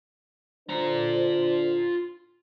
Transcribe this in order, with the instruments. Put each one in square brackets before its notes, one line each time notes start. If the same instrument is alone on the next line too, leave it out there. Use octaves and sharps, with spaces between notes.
[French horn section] D3 D4 C5 [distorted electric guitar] F4 A#5